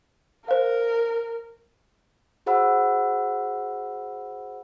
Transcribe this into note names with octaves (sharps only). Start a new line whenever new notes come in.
A#4 C5 F5
F#4 G#4 C5 F#5 B5 E6